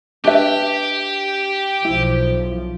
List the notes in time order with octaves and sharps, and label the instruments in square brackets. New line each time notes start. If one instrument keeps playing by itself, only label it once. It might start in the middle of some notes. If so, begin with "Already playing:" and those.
[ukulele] D4 B4 E5 [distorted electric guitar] G4 G5
[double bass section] B1 F3 [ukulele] E4